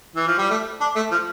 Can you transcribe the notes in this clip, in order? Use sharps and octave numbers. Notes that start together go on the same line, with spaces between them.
E3
F3
G3
A3
D4
A3
F3